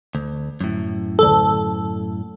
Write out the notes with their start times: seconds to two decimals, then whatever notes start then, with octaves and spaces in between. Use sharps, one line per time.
0.15 D2
0.61 F#2 A2
1.19 D2 A4